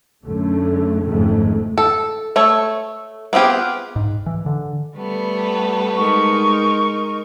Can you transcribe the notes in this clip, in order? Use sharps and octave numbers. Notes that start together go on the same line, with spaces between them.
F#2 D3 A3
F#1 F2 G#2 D#3 G#3 A3
A4
A3 A4 C#5
B3 C4 F4 G4 G#4
G#2
E3
D3
G3 A3 B3
G#3 D#4 A#4 C#6